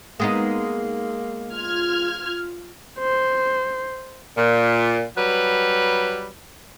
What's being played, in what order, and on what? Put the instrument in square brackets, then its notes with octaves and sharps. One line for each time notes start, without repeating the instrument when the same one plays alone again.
[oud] G#3 B3 D#4 [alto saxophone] A#3
[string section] F4 F6 G#6
[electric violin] C5
[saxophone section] A#2
F#3 G3 B4